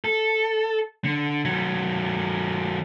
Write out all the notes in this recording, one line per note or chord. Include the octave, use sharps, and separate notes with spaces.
A4
D3
D#3 F#3